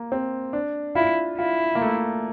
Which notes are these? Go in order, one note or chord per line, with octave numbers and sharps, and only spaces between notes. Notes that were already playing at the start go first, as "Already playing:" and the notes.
Already playing: A#3
C4
D4
E4 F4
E4 F4
A#3
A3